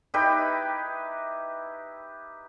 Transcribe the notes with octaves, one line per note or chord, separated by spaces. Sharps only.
D#4 E4 G4 B4